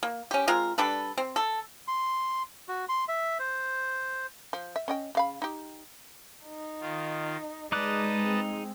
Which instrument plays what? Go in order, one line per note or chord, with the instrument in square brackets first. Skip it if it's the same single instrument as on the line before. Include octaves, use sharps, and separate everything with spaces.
[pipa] A#3
C#4 G4
G#3 C4 F4 A#4
G3 D4 A4 B4
C4
A4
[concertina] C6
F#4
C6
E5
C5
[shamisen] F3
E5
C#4 D#5 G5
C#3 F5 B5
D#4 G4
[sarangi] D#4
[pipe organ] D#3 F4
[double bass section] G#3 [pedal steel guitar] D#4 D6 F#6 [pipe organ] B4 D#5 A5 [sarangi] D5
[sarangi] C4